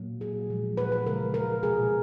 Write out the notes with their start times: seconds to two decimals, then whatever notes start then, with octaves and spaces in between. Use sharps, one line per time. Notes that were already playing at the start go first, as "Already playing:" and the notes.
Already playing: A#2 F#3 A#3
0.21 G#4
0.49 A#2 F3 G#3
0.77 B4
0.92 B4
1.06 C#3 F3 G#3 A#4
1.34 A#4
1.63 B2 G#3 G#4